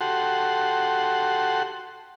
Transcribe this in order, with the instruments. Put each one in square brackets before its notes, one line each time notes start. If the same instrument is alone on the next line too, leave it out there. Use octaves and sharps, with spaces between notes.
[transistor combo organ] F#4 G4 A4 F#5 C6